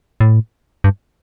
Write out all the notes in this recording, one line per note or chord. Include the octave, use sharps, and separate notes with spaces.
A2
G2